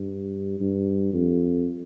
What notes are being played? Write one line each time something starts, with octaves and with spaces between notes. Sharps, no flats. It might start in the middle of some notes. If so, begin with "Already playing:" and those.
Already playing: G2
G2
F2